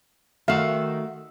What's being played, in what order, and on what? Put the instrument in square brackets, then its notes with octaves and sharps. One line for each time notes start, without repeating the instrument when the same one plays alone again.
[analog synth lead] D#3 [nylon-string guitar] A3 F#4 [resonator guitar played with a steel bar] E5 [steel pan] F5